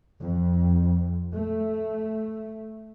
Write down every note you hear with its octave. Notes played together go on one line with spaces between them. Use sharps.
F2
A3